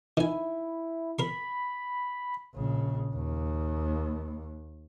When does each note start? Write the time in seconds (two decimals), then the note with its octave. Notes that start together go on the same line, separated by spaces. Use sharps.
0.17 D#3 E4 G#5
1.19 A#4 B5 C6
2.55 A#1 C#3
3.15 D#2